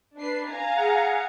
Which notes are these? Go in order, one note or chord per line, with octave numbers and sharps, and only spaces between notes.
D4 B4 C7
F5 G#5 A#5
G#4 F#5